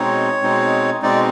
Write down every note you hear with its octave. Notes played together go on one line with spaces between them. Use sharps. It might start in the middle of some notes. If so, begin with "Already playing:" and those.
Already playing: B2 G#3 C4 D#4 C#5
B2 G#3 C4 D#4
B2 G#3 C4 D#4 D5